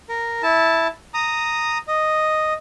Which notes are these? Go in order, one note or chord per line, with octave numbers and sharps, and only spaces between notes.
A#4
E4 A5
A#5 D#6
D#5